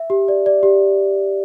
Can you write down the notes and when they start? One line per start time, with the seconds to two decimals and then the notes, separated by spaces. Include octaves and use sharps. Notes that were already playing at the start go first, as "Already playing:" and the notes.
Already playing: E5
0.10 G4
0.28 D5
0.46 D5
0.63 G4